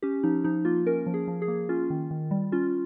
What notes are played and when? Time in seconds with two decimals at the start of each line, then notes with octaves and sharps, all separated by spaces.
0.02 C#4 G4
0.23 F3 D#4
0.44 F3 D#4
0.65 A#3 F4
0.86 C#4 A#4
1.06 F3
1.14 G#4
1.28 F3
1.42 G#4
1.48 A#3
1.69 C#4 F4
1.90 D#3
2.11 D#3
2.31 G3
2.52 C#4 F4